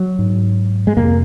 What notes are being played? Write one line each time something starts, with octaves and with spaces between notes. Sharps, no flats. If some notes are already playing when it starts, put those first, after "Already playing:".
Already playing: F#3
G#2
G#3
F2 C3 A#3